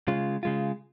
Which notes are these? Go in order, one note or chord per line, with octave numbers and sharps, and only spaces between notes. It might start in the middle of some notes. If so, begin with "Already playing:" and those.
C#3 G#3 F4
C#3 G#3 F4